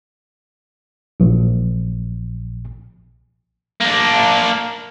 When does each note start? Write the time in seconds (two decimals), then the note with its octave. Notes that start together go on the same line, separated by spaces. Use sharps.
1.20 A#1
3.81 A#3 D4